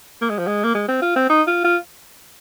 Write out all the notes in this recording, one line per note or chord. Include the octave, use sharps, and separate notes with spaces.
A#3
G#3
F3
G#3
A#3
G#3
C4
F4
C4
D#4
F4
F4